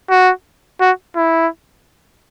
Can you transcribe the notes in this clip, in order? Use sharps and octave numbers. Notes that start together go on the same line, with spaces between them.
F#4
F#4
E4